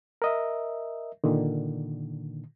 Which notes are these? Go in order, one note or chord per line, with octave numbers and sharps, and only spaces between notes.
A#4 D#5 E5
A#2 D3 D#3